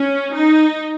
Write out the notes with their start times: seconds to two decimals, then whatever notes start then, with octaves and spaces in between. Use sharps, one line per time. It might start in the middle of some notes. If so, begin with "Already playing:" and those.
Already playing: C#4
0.33 D#4